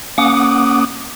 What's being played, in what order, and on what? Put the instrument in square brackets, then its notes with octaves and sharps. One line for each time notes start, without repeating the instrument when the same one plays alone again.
[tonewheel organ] A#3 C#4 F#5 D6 D#6